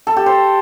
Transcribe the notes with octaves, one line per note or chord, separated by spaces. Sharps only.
A4
G4
C5